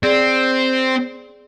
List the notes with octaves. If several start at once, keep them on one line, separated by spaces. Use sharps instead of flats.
C4 G#4 D5